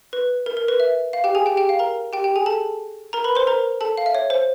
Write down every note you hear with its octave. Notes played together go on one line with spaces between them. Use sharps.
B4
A#4
A#4
B4
E5
F5
G4 G5
G#4 G#5
G4 G5
G4 G5
F5
A#4 A#5
G4 G5
G4 G5
G#4 G#5
A4 A5
A#4 A#5
B4 B5
C5 C6
A#4 A#5
A4 A5
F5
E5
C#5
C5